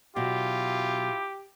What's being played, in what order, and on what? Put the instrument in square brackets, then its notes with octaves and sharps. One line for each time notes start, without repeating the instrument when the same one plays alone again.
[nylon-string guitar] B2 F#3 [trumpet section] E4 F4 [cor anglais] G4